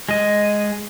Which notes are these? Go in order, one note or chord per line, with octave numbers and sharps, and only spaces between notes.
G#3 D#5